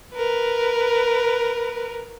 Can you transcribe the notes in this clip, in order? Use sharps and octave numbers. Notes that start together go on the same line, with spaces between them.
A#4 B4